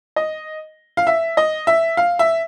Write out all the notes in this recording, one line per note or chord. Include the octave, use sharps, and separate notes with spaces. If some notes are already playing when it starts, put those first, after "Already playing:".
D#5
F5
E5
D#5
E5
F5
E5